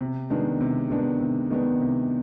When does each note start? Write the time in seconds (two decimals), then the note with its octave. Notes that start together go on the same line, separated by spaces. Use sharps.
0.01 C3
0.30 D#3 G#3 B3 D4
0.61 C3
0.90 D#3 G#3 B3 D4
1.20 C3
1.50 D#3 G#3 B3 D4
1.80 C3